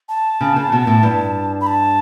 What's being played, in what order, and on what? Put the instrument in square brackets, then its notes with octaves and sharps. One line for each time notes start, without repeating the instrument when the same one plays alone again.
[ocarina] A5
[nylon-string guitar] C#3
C#3
B2
A2
G2
[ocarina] B5
A5